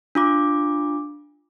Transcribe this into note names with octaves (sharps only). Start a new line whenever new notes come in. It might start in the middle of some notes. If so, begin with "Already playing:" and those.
D4 F4 D6